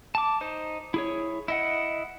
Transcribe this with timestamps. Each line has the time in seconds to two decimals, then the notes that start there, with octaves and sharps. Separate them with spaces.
0.15 A5 D6
0.41 D#4 C5
0.94 E4 G#4 C#5
1.48 E4 D#5 F#5